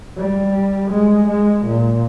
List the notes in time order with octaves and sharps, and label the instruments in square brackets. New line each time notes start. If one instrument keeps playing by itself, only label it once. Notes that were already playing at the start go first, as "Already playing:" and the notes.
[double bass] G3
G#3
G#3
A#2